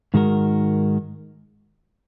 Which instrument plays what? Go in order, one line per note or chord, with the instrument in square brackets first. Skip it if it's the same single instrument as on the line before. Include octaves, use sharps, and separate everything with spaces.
[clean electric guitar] G#2 D#3 G#3 F#4 A#4